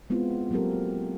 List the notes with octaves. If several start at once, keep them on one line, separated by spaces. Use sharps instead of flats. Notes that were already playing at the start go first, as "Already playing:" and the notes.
G#3 B3 C4 E4 F4
F#3 A#3 C4 G4 A4 A#4